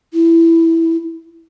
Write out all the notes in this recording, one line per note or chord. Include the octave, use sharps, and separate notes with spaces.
E4